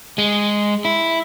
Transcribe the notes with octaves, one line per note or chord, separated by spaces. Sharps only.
G#3
E4